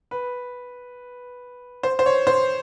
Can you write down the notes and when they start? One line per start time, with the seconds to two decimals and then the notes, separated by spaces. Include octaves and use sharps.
0.11 B4
1.83 C5
1.99 C5
2.06 C#5
2.27 C5